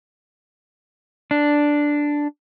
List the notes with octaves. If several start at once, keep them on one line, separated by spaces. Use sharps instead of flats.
D4